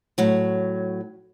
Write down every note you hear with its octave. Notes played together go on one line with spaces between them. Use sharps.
A2 F#3